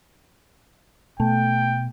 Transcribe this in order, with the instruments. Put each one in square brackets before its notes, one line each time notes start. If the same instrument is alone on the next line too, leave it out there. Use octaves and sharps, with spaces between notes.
[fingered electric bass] B2 [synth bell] A3 [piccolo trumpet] G5